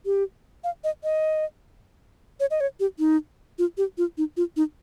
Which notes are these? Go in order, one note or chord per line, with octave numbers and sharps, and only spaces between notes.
G4
F5
D#5
D#5
C#5
D#5
C#5
G4
D#4
F4
G4
F4
D#4
F4
D#4